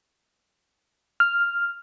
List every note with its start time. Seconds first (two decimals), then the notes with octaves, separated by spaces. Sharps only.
1.20 F6